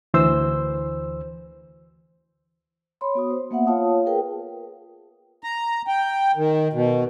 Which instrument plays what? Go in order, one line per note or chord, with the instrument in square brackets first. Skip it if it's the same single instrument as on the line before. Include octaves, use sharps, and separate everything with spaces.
[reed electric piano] D2 E3 C5 E6
[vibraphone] C#5 B5 C6
B3 F#4 D#6
C5
A#3 B3 E5 F#5
F4 C#5 F5 A5 D#6
G#4 A#4 B4 G5
[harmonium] A#5
G5
D#3
B2